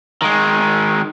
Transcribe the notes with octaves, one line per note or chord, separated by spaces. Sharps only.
D#3 G#3